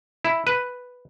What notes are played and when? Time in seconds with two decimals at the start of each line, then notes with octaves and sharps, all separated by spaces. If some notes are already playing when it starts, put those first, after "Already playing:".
0.25 E4
0.47 B4